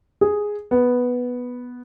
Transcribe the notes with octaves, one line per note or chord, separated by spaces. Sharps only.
G#4
B3